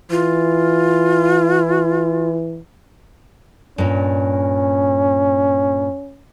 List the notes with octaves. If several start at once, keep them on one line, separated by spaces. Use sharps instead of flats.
E3 F4
G2 A#2 C#4